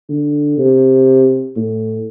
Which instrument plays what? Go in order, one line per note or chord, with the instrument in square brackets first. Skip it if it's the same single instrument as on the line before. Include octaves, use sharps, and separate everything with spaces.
[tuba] D3
C3
A2